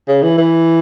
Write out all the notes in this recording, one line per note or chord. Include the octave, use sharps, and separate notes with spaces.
C#3
E3
E3